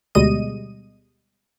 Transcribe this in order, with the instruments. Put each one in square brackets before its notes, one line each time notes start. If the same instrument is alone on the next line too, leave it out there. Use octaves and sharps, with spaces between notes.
[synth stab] D2 B2 G3 G#3 D#5 D#7